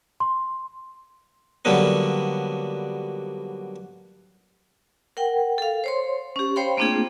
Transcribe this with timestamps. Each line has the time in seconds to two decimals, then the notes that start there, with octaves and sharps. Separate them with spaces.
0.20 C6
1.65 D3 F#3 G3 A#3 B3
5.17 A#4 F#5 G5
5.58 A4 F5
5.84 C5 C#5 C6
6.36 C#4 G4
6.56 C5 C#5 F5 G5 B5 C6
6.77 A3 A#3 C4 D4 F4 G#4